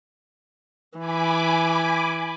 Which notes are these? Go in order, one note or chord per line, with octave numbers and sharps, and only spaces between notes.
E3 G#5 B5 D6